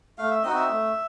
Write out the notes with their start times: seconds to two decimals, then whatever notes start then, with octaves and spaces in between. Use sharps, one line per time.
0.18 A3 F5
0.31 E5
0.43 C4 D#4 F#4 D#5
0.55 E5
0.68 A3